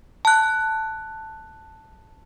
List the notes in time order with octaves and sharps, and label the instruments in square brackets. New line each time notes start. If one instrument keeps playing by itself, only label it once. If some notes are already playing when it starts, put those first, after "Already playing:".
[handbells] A5 F#6